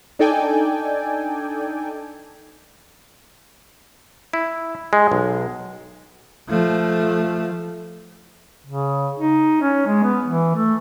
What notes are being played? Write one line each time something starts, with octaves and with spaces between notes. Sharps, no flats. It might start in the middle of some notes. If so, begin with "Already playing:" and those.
D4 D#4 A4 D5 G5 G#5
E4
G#3
B1
F3 A3
C#3
D#4
C#4
G#3
B3
E3
A3